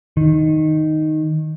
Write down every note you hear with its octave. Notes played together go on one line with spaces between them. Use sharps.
D#3